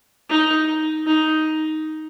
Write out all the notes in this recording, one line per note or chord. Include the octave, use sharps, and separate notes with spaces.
D#4
D#4